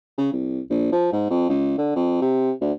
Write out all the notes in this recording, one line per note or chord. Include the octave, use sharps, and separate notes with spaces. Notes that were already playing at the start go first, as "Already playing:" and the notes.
C#3
C2
A#1
F3
G#2
F2
C#2
D3
F2
C3
D2